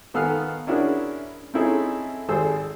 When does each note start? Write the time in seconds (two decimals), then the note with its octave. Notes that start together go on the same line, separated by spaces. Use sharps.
0.14 D#3 B3 A4 F5 G#5 F6
0.67 C#4 D4 E4 F#4 G#4 A#4
1.54 C4 C#4 D#4 E4 G#4 A4
2.28 G#1 G3 G#4 A4 C5 E6